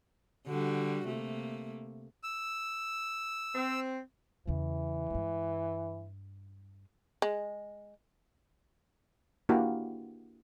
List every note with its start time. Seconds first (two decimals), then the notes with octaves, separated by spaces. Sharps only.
0.48 D3 G3 F#4
1.06 C3 A3 A#3
2.23 E6
3.54 C4
4.47 E2 C#3 E3
5.10 G2 G#3
7.22 G#3
9.49 A#3 D4 E4 F#4 G4